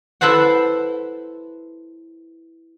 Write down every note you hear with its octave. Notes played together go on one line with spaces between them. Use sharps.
E4 A4 B4 C5 F#5